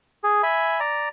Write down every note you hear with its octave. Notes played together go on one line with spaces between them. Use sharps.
G#4
E5 G#5 B5
D5 A#5